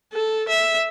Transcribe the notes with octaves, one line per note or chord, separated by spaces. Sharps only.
A4
E5